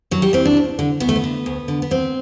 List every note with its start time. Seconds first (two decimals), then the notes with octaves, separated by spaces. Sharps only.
0.11 F#2 F#3
0.22 G3
0.33 E3 C4
0.46 D4
0.57 D2
0.79 D3
1.00 D2 B3
1.09 A3
1.16 B3
1.24 D3
1.46 D2
1.68 D3
1.82 B3
1.91 D2 C4